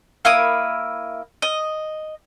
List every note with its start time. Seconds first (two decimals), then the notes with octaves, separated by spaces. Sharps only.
0.25 A#3 E4 B5 D#6
1.42 D#5